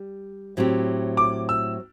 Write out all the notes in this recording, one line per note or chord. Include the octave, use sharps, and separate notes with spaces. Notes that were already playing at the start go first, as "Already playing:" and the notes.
Already playing: G3
A2 F#3 C4 G4
D6
E6